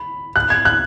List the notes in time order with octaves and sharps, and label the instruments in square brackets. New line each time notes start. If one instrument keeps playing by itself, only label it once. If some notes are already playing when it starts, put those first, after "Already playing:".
Already playing: [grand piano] B5
F#6
G#6
F#6